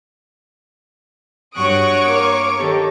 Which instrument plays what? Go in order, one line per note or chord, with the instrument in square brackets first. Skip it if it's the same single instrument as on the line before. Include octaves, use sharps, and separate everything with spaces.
[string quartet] G2 F#6 [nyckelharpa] F#4 D#6 [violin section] C#5 C#6 D7
[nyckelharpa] A#3 A#4 [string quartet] D6
[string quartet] D#3 [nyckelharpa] G4 A4